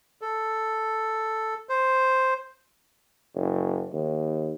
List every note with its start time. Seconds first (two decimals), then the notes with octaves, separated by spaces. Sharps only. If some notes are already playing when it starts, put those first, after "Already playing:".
0.22 A4
1.69 C5
3.35 F#1
3.93 D#2